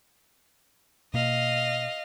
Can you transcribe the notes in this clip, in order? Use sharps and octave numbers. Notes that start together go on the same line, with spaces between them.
B2 A#3 D#5 F5